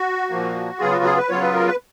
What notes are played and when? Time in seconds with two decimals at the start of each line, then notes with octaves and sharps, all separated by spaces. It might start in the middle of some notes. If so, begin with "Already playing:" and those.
Already playing: F#4
0.30 A#2 F3 A#3
0.79 C#3 F#3 B3 F4 G#4
0.92 F#4
1.04 G#4
1.17 B4
1.29 C#3 F#3 B3 F4 C#5
1.42 B4
1.54 A#4
1.67 B4